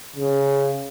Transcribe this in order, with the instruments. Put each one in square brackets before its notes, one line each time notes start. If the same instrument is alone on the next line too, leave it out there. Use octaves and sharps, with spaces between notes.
[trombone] C#3